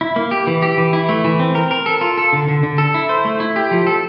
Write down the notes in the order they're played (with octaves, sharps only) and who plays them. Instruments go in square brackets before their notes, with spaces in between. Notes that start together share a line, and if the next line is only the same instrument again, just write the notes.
[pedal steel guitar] E4
A#3
G4
E3
G4
E3
E4
A3
E3
C4
A#4
A#4
A4
F4
A4
D3
D3
D3
A4
E4
C5
A3
E4
G4
F3
A4